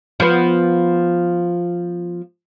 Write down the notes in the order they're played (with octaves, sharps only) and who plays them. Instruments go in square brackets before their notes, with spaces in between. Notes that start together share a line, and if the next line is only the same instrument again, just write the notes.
[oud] F3 B3